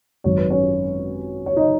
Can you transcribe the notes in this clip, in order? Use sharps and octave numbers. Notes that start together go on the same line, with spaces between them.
G#1 F#2 D#3 C#5
B4
C#4 C#5
C#5
D#4 D#5